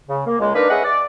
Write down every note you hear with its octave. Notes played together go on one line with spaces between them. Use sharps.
C#3
A#3
C#2 G#3
A#3 D4 D#4 A#4 B4
C#4 G#4 B4 D#5 E5 F#5
D5